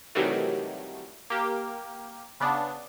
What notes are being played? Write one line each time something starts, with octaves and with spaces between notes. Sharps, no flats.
C3 D#3 E3 F#3 G3 A3
A#3 G4
C#3 B3 D4